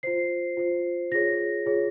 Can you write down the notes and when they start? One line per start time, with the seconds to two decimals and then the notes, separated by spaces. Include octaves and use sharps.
0.03 F4 C5 C7
0.57 F4 C5
1.12 F4 G#4 C#5 A#6
1.66 F4 G#4 C#5